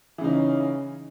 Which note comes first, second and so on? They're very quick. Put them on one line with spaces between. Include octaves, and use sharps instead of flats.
E3 C#3 D#4 C#4